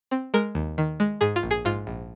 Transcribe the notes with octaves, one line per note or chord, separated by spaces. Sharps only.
C4
G#3 A#4
D#2
D#3
G#3
G#2 G#4
F4
A#1
G#4
G#2 F4
A#1